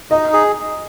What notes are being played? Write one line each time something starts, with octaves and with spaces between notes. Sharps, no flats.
D#4 D#5
G#4